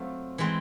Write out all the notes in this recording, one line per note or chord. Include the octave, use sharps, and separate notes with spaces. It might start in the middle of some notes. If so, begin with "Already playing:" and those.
Already playing: F#3 A3 C4 F4 A4
E3 G#3 C4